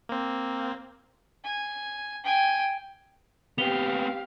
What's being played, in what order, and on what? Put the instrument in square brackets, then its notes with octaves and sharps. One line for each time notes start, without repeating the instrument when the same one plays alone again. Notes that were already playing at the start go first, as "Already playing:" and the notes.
[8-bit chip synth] A#3 C4
[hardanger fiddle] G#5
G5 G#5
[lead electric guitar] B3 C4 [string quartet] G4 F5 [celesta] F7 G7